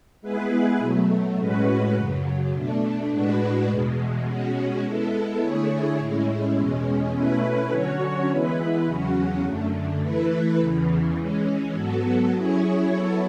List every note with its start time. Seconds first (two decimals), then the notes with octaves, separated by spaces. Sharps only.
0.21 G#3 B3 E4 G#4 B4
0.79 B2 F#3 A3
1.37 A2 G#3 C#4 F#4 B4
1.94 F#2 C#3 F#3
2.51 B2 A3 D4
3.09 A2 G#3 D4 F#4 B4
3.68 E2 B2 G#3
4.24 B2 G#3 C#4 F#4
4.82 G#3 B3 E4 A4
5.39 D3 A3 E4 G#4 C#5
5.98 A2 G#3 C#4 E4
6.55 E2 B2 G#3 C#4
7.13 B2 A3 C#4 E4 B4
7.70 D3 F#3 C#4 F#4 C#5
8.28 E3 G#3 B3 E4 B4
8.85 E2 C#3 F#3 C#4 F#4
9.43 F#2 D3 A3
10.01 E3 A3 E4 B4
10.58 E2 C#3 E3
11.15 E3 G#3 C#4
11.73 G#2 F#3 B3 F#4 A4
12.32 F#3 C#4 E4 G#4 C#5
12.89 F#3 B3 E4 A4 C#5